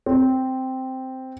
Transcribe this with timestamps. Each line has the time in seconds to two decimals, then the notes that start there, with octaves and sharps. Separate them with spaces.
0.06 C4